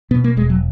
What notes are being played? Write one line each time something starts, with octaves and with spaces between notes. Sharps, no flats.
B2 B3
A#3
E1 G#3
F#3